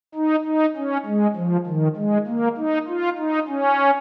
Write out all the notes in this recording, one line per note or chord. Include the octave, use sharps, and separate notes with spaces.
D#4
D#4
C#4
G#3
F3
D#3
G#3
A#3
D#4
F4
D#4
C#4